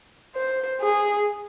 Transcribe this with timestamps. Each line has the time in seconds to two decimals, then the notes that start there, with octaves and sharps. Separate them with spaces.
0.36 C5
0.81 G#4